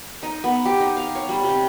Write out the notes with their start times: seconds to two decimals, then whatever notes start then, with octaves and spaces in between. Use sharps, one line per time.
0.23 D#4
0.44 B3
0.65 G4
0.80 D#4
0.97 F5
1.15 C#5
1.29 G3
1.43 C3